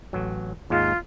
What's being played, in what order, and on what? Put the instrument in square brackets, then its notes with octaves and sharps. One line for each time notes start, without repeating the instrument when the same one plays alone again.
[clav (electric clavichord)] A1 F#3
[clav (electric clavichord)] D#2 G#2 G#3 [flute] F4